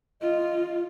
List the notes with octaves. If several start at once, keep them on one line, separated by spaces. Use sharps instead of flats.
F4 D#5